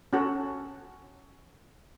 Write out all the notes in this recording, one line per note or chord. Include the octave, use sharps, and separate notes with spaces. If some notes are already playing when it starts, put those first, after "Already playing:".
C#4 F#4 A4